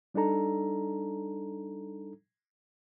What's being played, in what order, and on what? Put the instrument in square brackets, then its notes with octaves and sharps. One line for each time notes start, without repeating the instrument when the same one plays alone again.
[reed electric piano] G3 D4 D#4 A4 A#5